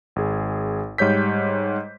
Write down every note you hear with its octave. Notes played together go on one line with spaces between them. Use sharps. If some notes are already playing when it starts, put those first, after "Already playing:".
G#1 G#4
G#2 G3 C#5 G6 B6